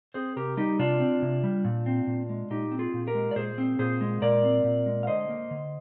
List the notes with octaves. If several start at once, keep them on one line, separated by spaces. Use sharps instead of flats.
C4 G#4 C5
C3 G4 A#4
G3 D#4 G4
C3 D4 F4
C4
C3
G3
A#2
C4
A#2
G#3
A#2 D#4 G4
C4
F4 G#4
A#2
G4 A#4
G#3
D5
A#2 G#4 C5
C4
A#2 G#4 C5
G#3
A#2 A#4 D5
C4
A#2
G#3
F5
D3 C5 D#5
A#3
D3